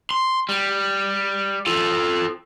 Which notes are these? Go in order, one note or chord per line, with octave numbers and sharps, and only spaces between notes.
C6
G3
F4 A4